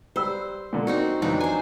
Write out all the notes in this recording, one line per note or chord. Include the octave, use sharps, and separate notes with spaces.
G3 B4 C5 E6
A#2 D3
C4 D#4 F#4 A#4
F2 E3 F#3 D4 D#4
C5 G#5